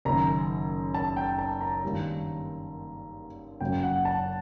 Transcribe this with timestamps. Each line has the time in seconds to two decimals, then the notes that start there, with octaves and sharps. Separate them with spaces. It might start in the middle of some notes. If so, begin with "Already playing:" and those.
0.05 F#1 F#2 D#3 A#5
0.95 A5
1.17 G5
1.39 A5
1.61 A#5
1.84 G2 D#3 G3 A#3
3.61 F#1 F#2 F#3 A#3 G5
3.83 F#5
4.05 A5